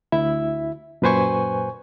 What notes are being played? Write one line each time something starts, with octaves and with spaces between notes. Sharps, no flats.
D2 E4 E5
F#2 A#2 B4 C5 G#5 C#6